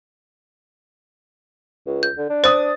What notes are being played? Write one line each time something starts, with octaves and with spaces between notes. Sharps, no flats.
C#2
G6
D3
D4
C5 D#6 A6